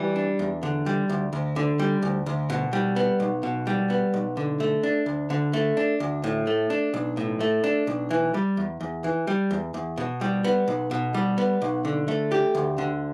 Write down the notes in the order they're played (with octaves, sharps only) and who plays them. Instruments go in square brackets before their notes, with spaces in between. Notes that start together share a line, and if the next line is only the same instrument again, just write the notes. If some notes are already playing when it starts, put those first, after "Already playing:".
Already playing: [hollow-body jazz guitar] E3 G3
D4
E2
D3
G3
D2
D2
D3
G3
D2
D2
B2
G3
B3
B1
B2
G3
B3
B1
D3
A3
D4
D2
D3
A3
D4
D2
A2
A3
D4
B1
A2
A3
D4
B1
E3
G3
E2
E2
E3
G3
E2
E2
B2
G3
B3
B1
B2
G3
B3
B1
D3
A3
G4
D2
D3